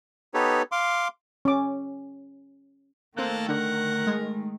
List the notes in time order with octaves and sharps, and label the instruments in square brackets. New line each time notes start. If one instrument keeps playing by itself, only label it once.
[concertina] B3 D#4 G4 A4 B4 C#5
F5 C6 D6
[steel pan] C#4 D6
[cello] D#3 A3 [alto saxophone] A#3 [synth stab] C4 F#6 [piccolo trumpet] A4
[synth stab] D3 [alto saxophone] A#4 [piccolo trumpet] F#5
[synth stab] G#3